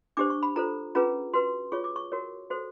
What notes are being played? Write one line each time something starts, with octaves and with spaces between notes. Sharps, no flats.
D4 G4 C5 D6
C#6
B5
F4 A4 C5 A#5
C#4 F4 G#4 B4 A#5
F#4 B4 C6
F4 G#4 C#5 C#6
D6
C#6
F#4 A#4 C#5
F#4 A4 C5